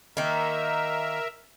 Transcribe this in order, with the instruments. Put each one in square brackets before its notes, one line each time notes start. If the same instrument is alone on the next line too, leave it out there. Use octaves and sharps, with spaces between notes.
[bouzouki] D#3 A#3 [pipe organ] A#4 E5